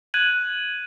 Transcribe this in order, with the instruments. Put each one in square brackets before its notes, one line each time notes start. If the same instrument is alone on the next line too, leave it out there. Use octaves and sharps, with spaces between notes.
[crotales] F#6 G#6 D#7 F#7